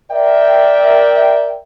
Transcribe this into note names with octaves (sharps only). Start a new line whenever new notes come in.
A#4 D5 E5 G5